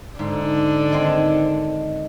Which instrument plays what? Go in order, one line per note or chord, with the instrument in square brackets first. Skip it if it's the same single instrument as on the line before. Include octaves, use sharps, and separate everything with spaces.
[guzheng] G#2 [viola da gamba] D3
[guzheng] D#3 G#3 C4